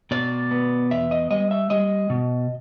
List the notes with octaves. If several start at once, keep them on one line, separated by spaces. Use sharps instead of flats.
B2 D5
B3
E2 E5
D#5
G3 D#5
E5
G3 D#5
B2